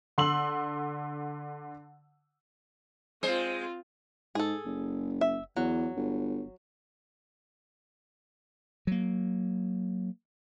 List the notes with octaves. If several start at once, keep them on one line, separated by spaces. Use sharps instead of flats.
D3 C6 E6 F#7
G#3 C4 F4 C5
G#2 G#4 A4
F#1
E5
E2 F#3
G1
F#3 A#3